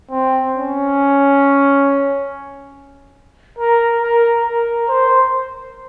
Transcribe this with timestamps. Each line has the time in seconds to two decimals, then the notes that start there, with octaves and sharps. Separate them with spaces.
0.11 C4
0.55 C#4
3.59 A#4
4.02 A#4
4.46 A#4
4.89 C5